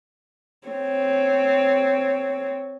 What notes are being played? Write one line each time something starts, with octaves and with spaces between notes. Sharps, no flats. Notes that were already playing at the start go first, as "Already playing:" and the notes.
C4 C#5